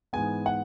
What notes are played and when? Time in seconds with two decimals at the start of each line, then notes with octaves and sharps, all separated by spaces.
0.13 G#2 E3 G#3 B3 G#5
0.46 F#5